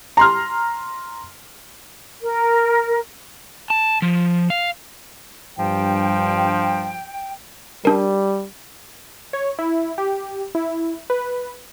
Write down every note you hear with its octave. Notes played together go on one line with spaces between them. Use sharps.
A#5 C6 F6
A#4
A5
F3
F5
G2 F3 G5
G3 D4 A#4
C#5
E4
G4
E4
B4